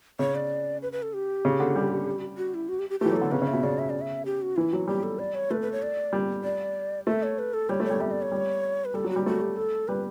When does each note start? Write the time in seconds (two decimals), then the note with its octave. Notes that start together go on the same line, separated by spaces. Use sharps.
0.19 C#3 C#5
0.35 D5
0.82 B4
0.92 B4
1.02 A4
1.14 G4
1.45 C#3
1.60 D3
1.76 G3
2.37 F#4
2.54 E4
2.69 F#4
2.79 G4
2.90 G4
3.00 A3 G4
3.06 E3
3.10 F#3
3.16 A4
3.21 D3
3.32 C#3 B4
3.42 C#3
3.47 E5
3.53 B2
3.63 C#3 D5
3.79 E5
3.90 D5
4.01 E5
4.26 G4
4.42 F#4
4.56 E3 E4
4.73 F#3 F#4
4.88 G3 G4
5.03 A4
5.19 D5
5.35 C#5
5.51 A3 B4
5.62 B4
5.72 C#5
5.82 D5
6.13 G3
6.44 D5
7.07 A3 E5
7.23 C#5
7.39 B4
7.54 A4
7.69 G3 C#5
7.80 A3
7.85 G3 C#5
8.00 G3 E5
8.11 D5
8.22 C#5
8.32 G3
8.85 B4
8.94 G3 A4
9.04 F#3
9.10 F#4
9.16 G3
9.26 A3 F#4
9.41 G4
9.56 A4
9.88 G3 B4